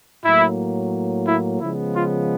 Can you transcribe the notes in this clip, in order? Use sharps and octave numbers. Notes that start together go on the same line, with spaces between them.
A2 F#3 A#3 E4
E4
C#3 F3 G#3 B3 E4
F4